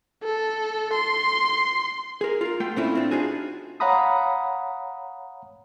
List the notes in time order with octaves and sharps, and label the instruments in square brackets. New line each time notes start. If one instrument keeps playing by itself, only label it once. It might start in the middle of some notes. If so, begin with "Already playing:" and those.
[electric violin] A4
C6
[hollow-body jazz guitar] G#4 A#4
F4 A#4
A3 F4 F#5 G5 C6
A#2 A3 C4 C#4 E4 F4
C4 D4
D4 D#4 F4 F#4 G#4
[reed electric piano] C#5 F5 F#5 A#5 B5 D#6